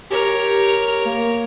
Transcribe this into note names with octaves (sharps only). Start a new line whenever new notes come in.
G4 A#4 C#5
A#3